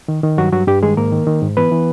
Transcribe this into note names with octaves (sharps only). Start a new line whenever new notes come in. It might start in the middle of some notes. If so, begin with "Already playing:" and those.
D#3
D#3
G2 F#3 F#4
G2 F#3 F#4
G2 G3 G4
D#3 G#3 G#4
G#2 A#3 A#4
D#3
D#3
G#2
E3 B3 B4
E3